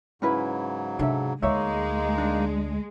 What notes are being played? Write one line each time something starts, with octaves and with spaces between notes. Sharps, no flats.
G#2 C#3 F#3 C#4 E4 B4
C3 D4 A4 E5
D2 G#3 A#3 D#4 C#5 E5
D4